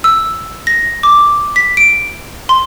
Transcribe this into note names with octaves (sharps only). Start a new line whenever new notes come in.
E6
A#6
D6
B6
D7
C6